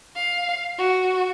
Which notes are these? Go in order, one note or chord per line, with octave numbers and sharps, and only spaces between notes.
F5
F#4